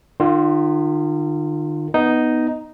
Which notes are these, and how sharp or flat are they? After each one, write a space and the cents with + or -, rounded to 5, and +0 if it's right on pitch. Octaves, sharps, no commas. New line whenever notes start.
D#3 -40 F4 +0
B3 +0 D#4 +0